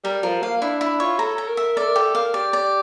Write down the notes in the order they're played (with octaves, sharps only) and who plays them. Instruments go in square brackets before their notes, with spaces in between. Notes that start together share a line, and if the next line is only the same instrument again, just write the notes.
[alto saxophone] G3 [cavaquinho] A#4
[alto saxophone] F3 [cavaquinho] A#4
[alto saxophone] A#3 [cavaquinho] F5
[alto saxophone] D4 [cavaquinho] E4
[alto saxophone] D4 [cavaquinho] E4
[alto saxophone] F4 [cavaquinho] C#5
[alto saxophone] A4 [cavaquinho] A#5
[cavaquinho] A#5
[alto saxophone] A#4
[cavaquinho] E5
[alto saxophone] A4 [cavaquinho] D5
[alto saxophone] A#4
[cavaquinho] G4 [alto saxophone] A4
[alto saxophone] A#4 [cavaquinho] F5
[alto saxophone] G4 [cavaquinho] D5
[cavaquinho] D5